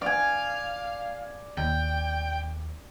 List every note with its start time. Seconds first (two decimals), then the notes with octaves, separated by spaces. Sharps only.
0.02 D5 F5 G#5
1.57 D#2 G5